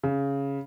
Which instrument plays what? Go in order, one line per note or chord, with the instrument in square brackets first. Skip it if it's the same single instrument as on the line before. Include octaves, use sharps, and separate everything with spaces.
[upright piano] C#3